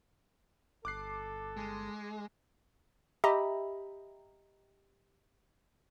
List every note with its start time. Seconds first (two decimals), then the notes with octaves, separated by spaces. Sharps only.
0.85 G1 A4 D6 F#6 C7
1.57 G#3
3.24 G4 D#5 E5 A#5 B5